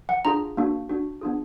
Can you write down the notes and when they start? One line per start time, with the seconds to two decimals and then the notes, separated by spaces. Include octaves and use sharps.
0.09 F#5
0.25 D4 F4 G#4 A#5
0.57 A#3 D4 F#4
0.90 D4 F#4
1.21 B3 D4 F4 G#4